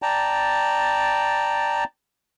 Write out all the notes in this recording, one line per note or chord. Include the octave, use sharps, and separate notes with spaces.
D5 G5 A5 A#5